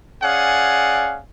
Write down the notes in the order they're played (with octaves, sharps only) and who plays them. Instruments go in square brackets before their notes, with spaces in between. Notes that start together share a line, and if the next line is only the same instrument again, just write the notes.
[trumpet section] C#4 G#4 D5 F5 F#5 G#5